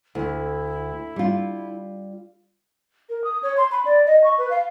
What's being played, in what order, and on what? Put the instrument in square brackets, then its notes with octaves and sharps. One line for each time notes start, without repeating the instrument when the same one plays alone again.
[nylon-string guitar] D2 [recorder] E4
[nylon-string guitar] G3 F4
[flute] A#4
D#6
C#5
C6
B5
D5
D#5
C#6
B4
F5